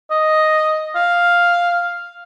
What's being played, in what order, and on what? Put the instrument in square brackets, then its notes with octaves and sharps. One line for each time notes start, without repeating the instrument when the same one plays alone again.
[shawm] D#5
F5